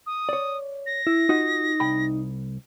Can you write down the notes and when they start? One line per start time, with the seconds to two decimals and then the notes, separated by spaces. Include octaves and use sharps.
0.07 D#6
0.29 C#5 D5
0.86 A#6
1.07 E4
1.29 D#4 F4 F#4 F#5
1.80 C2 G5 B5